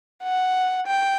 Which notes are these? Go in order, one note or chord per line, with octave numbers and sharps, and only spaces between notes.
F#5
G5